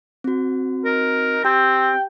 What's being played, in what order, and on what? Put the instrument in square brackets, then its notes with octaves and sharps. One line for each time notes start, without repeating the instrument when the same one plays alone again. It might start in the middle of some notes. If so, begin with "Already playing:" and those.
[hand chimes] C4 F#4
[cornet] D#4 [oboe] A#4
[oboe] C4 [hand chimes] G4 [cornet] G5